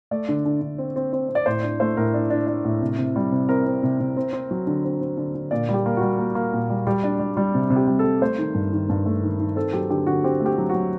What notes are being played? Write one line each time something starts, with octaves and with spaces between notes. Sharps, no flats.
A3 D5
D3
D3
D3
C4
C4
C4
C4
D5
A2 C5
D4
A3 C5
A2 A#4
D4
D4
D4
A2
C3
C3
G3
C3
C4 A#4
C4
C3
C3
C4
C4
F#3
D3
C4
C4
D3
D3
A#2 D5
G3
G4
A#3
G3 F#4
A#3
A#3
A#2
G3
G3 G4
D4
G3
G3
C3
C3
G4
G3
G3 A4
A3 C5
D#3
G2
D#3
G2
A3
D#3
D#3
C4 A4
F#3 G4
D3 G4
D3 F#4
C4 G4
A3
G4
F#3
F#4
F#3